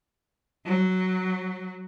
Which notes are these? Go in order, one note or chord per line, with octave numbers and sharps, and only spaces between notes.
F#3